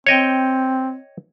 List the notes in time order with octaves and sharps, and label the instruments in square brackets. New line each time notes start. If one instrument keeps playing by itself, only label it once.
[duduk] C4 [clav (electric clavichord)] C#5 D#5 G5